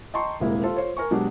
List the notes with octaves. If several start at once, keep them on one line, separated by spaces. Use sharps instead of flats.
D#5 G5 A5 A#5 C6 C#6
D#1 C2 G#3 A#3 E4
F4 A4 C5
F4 C5 C#5
A#4 G#5 C#6
B2 F#3 G#3 D4 G4